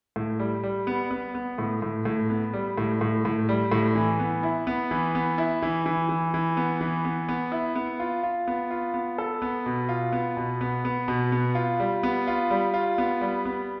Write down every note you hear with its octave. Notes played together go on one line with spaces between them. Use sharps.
A2
G3
G3
B3
B3
B3
A2
A2
A2
B3
G3
A2
A2
A2
G3
A2
E3
B3
E4
B3
E3
B3
E4
E3
E3
E3
E3
B3
E3
B3
B3
E4
B3
F4
F4
B3
F4
B3
A4
B3
B2
F4
B3
B2
B3
B3
B2
B3
F4
G3
B3
F4
G3
F4
B3
G3
B3